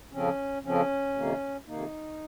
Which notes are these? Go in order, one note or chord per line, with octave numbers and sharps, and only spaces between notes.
F2 C#3 F3 C4 C#4
F2 C#3 F3 C4 C#4
F2 C3 D#3 A#3
F2 C3 D#3 A#3 D#4